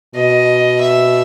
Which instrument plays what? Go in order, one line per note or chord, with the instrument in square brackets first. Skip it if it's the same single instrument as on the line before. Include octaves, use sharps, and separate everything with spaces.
[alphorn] B2 [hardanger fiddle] D#5
[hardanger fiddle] E5